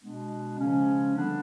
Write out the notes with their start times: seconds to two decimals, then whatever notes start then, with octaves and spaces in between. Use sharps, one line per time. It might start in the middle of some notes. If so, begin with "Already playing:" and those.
0.01 B2 G#3 B3 D4
0.58 C#3 F3 G#3 C#4
1.16 D3 G3 B3 D4